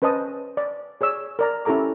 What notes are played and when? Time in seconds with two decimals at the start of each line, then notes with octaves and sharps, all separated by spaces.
0.02 C#4 B4 C5 D#5 A5 D#6
0.57 D5
1.01 G#4 C#5 D5 E6
1.39 A#4 D5 A#5
1.65 C#4 E4 G4 A4 A#5 D6